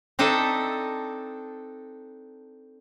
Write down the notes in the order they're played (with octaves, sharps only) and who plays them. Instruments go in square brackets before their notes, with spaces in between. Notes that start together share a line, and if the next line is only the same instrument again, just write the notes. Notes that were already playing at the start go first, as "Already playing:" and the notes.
[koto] C4 D4 D#4 A4 D#5 E5